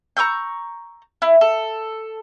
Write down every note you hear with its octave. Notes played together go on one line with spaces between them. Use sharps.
A#5 C#6 E6 G6
E4
A4